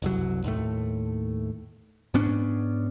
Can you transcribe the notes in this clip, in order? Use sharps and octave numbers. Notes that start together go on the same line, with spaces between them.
F#1 C2 F#3
D#2 A2 A3
G#2 B3 C#4 D4